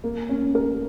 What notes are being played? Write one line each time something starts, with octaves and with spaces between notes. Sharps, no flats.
A#3
C#4
A#4